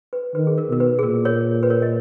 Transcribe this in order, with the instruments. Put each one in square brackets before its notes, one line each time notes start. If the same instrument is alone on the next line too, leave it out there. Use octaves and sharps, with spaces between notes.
[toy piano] B4
[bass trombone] D#3 [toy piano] B4
[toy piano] G#4
A#4
[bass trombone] B2 [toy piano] A#4
[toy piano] B4
G#4
[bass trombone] A#2 [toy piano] A#4
[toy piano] A#4 C#5
B4
A#4 C#5
D#5